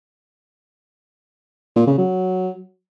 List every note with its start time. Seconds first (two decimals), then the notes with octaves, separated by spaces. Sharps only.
1.76 A#2
1.87 C#3
1.98 F#3